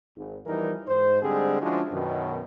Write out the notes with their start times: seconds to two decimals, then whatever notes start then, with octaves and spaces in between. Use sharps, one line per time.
0.16 G#1
0.46 E2 E3 F3 G3 D#4 A#4
0.88 G#2 C5
1.22 D3 G3 G#3 C4 G#4
1.61 F3 G#3 C#4 D4 E4 F#4
1.92 F#2 B2 D#3